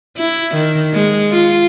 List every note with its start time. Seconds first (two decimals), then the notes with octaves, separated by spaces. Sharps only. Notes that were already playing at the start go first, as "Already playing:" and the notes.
0.18 E4
0.55 D#3
0.93 G#3
1.31 F4